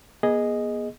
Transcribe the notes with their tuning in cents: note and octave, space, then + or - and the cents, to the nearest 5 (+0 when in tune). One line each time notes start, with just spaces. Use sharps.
B3 -45 G#4 +0 D#5 +0